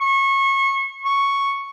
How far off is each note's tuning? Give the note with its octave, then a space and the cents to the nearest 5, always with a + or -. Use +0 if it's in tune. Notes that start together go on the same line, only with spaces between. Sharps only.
C#6 -25
C#6 +0